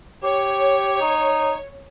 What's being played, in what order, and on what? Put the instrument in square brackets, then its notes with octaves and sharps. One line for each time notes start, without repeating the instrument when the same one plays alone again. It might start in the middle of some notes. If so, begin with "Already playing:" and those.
[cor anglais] G4 [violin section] C#5
[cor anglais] D#4